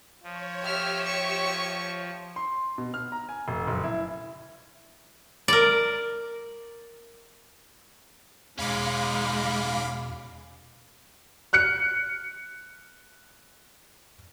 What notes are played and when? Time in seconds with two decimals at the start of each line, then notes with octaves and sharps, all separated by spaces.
0.23 F3 C#5
0.64 G4 E5 F6
1.05 C#6
2.36 C6
2.78 B2
2.94 F6
3.12 A#5
3.29 G#5
3.48 F1
3.68 F#1
3.84 E4
5.48 A#4 D5
8.59 E2 B2 G#3 C#4 D#4 F5 B5 D6
11.53 F6 F#6 C#7